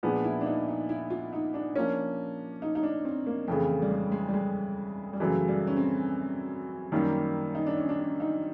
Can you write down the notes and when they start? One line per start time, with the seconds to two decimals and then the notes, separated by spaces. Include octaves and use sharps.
0.03 A#2 F3 G#3 B3 D4
0.24 E4
0.41 D4
0.46 D#4
0.68 D#4
0.89 E4
1.10 F4
1.33 D#4
1.54 D4
1.76 F3 A#3 C#4
2.62 D#4
2.75 D#4
2.83 D4
3.05 C4
3.27 A#3
3.48 F2 C#3 E3 A3
3.69 A3
3.82 G3
3.91 G#3
4.12 G#3
4.28 G3
4.34 G#3
5.13 G3
5.20 F#2 C#3 E3 F#3 A3
5.48 G3
5.67 C#4
5.77 C4
6.92 F#2 D#3 G3 A#3
7.55 D#4
7.67 D4
7.77 C#4
7.89 D4
7.99 C#4
8.20 D#4